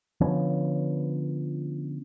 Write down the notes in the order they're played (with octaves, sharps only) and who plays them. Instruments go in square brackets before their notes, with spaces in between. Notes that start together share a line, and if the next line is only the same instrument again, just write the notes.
[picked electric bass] D3 F3 B3 C#4